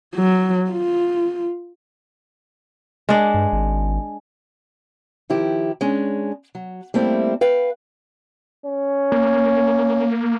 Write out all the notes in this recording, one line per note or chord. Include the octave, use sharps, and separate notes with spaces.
F#3
F4
G#3 D4
G2
G#1
D#3 F3 E4 G4
G#3 C#4 D4
F#3
G3 A3 A#3 C4 E4 G4
B4 F5 G5
C#4
A#3